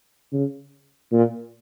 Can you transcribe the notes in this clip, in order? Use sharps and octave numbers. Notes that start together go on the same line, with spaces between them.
C#3
A#2